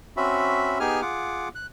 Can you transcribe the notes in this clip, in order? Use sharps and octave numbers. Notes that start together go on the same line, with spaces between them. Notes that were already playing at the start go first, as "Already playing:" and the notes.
C4 C#4 F#4 E5 B5
B3 D#4 G4 G#4 G#5 F6
F4 G#4 F#5 D6
F#6